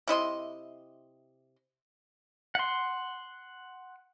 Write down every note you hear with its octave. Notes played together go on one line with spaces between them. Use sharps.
C3 E4 D#5 C6
F#5 C6